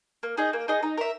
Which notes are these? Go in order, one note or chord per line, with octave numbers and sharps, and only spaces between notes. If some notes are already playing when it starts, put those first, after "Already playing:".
A#3
D#4 G#4 D#5
A#3
D#4 G#4 D#5
D#4
A#4 E5